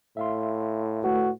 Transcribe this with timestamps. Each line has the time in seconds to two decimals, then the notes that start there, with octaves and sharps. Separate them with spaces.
0.17 A2 E5 F5 C6
1.04 A3 F#4 B4